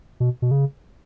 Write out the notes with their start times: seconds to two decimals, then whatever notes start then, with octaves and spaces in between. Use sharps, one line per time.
0.20 B2
0.42 B2
0.51 C#3